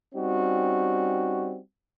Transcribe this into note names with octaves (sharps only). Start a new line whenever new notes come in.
G3 C4 C#4 D#4 F#4